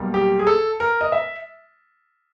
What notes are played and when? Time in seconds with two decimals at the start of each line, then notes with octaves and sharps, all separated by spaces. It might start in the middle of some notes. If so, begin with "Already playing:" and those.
Already playing: B1 B2 G3 A#3
0.14 G4
0.39 G#4
0.47 A4
0.80 A#4
1.01 D#5
1.12 E5